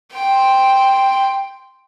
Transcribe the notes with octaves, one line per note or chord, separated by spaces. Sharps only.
G5 C6